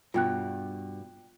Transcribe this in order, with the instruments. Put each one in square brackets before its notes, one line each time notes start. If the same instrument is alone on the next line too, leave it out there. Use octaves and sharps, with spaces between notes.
[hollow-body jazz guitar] G2 B2 [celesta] F4 G5 F#6